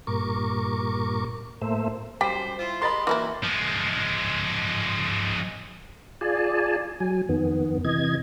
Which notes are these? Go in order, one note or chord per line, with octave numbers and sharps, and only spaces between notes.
G2 A#2 A#4 C#6 D6
A2 A3 A#3 C5 E5
F#2 G3 C5 G5 B6
E4 F4 C5
G#3 G4 A#4 D#5 B5 C6 A6
D#3 E3 F#3 A#3 E4 F#4
F3 G#3
F4 G#4 D5 G#5 A5
F#3 G#5
F2 D#3 B3
C3 E3 D#5 G#6